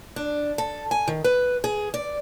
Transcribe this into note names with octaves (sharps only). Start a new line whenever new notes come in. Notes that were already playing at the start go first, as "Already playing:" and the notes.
D4
A4
G#5
D#3
B4
G#4
D5